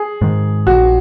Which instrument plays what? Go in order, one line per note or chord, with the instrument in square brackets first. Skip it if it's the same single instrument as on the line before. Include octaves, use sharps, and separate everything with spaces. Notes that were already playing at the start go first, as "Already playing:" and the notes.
Already playing: [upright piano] G#4
[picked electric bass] G#2 D#3
[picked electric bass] A#1 [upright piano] F#4